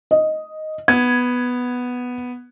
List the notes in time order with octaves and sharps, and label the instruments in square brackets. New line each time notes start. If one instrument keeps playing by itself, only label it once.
[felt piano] D#5
[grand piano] B3 [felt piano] G#6